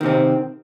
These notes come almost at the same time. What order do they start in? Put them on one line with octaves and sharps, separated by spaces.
D#3 C3 C4